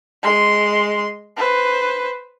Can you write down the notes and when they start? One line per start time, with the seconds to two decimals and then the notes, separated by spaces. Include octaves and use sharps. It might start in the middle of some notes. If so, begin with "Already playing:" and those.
0.23 G#3 C6
1.37 B4 C5